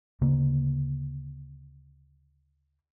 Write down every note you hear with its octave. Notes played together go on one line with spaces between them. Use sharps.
D2 C#3 A#3